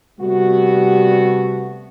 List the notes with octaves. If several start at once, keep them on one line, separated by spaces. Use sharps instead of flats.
C3 G3 A3 B3 F#4